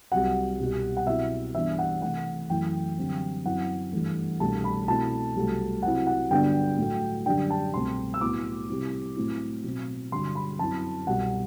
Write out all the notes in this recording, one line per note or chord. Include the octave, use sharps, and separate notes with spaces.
C2 C3 F#3 F#5
C2 B2 G3
F#5
B2 F#3 C4 E4 E5
G2 E3 B3 D4 E5
F#5
C3 E3 A3 F#5
F#2 E3 A3 E4 G5
F#2 D3 G3 C4
F#2 F#3 C4 E4 F#5
G2 E3 A3
C2 B2 A3 D4 A5
B5
B2 A3 C4 E4 A5
C2 C3 F#3 A3
C3 F#3 C4 E4 F#5
F#5
G2 D3 F#3 B3 D4 G5
A2 F#3 A3
F#2 D3 G3 D4 G5
A5
C2 B2 A3 C4 C6
E6
A2 F#3 B3 E4 D6
C3 G3 C4 E4
A2 F#3 C4 E4
B2 F#3 C4
G2 D3 F#3 C6
B5
F#2 F#3 C4 E4 A5
C2 B2 F#3 F#5